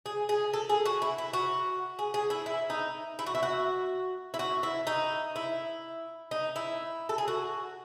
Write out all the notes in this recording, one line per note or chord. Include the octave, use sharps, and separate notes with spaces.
G#4
G#4
A4
G#4
F#4
E4
E4
F#4
G#4
G#4
E4
E4
D#4
E4
F#4
E4
F#4
E4
F#4
E4
D#4
E4
D#4
E4
A4
G#4
F#4